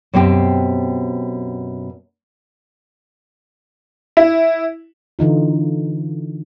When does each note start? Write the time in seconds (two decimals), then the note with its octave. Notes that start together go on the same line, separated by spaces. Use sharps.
0.13 F#2 B2 C4 G4
4.17 E4
5.19 D3 E3 D#4 F4